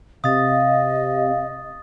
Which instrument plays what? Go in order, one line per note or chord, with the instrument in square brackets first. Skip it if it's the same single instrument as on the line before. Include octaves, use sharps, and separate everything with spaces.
[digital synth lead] C3 [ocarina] D#5 [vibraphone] F5 [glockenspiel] D#6 A6